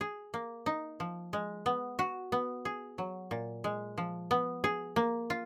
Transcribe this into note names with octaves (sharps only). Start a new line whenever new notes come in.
G#4
A#3
D#4
F3
G#3
B3
F#4
B3
G#4
F#3
A#2
G#3
F3
B3
G#4
A#3
F4